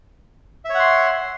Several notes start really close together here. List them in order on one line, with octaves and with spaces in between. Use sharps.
E5 C#5 F#5 C6